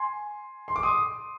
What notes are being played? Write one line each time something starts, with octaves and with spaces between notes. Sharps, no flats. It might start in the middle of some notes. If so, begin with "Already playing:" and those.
Already playing: G#5 C6
C6
D6
C6 D#6